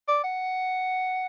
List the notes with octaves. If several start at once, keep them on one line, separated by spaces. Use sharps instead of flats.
D5
F#5